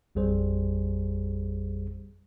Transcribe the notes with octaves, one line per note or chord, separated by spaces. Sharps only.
A1 F2 G3 G#4 C5